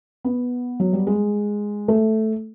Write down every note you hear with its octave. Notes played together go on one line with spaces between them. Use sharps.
B3
F#3
G3
G#3
A3